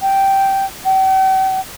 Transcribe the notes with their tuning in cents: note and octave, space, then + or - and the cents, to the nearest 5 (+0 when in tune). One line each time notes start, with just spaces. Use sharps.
G5 -10
G5 -45